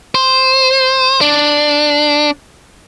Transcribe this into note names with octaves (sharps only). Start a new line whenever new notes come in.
C5
D4